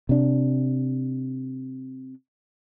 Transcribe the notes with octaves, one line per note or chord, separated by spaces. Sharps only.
C3 D4